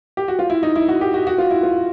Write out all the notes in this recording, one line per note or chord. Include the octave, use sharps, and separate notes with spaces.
G4
F#4
F4
E4
D#4
E4
F#4
G4
F#4
F#4
F4
E4
F4